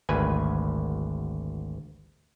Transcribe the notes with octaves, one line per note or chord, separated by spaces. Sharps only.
G#1 D2 B4 G#5